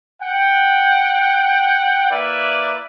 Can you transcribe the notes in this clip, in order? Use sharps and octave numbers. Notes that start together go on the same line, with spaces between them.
F#5 G5
A#3 E4 B4 D5 E5